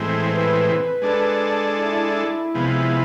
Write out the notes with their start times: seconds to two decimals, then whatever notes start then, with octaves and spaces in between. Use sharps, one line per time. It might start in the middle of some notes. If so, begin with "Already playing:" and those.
Already playing: A2 E3 G#3 C4
0.26 B4
1.02 G#3 D4 A4
1.79 E4
2.54 C3 F3 G#3 B3